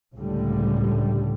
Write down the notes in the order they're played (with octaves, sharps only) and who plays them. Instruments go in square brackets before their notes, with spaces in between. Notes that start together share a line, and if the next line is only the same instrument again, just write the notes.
[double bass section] C#2 A2 D3 G3